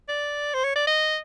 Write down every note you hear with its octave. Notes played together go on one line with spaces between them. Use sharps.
D5
C5
C#5
D5
D#5